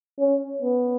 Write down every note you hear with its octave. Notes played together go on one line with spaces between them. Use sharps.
C#4
B3